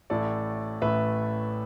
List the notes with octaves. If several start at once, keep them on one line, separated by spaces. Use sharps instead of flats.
A1 A2 A3 A4 D5
A1 A2 A3 B4 E5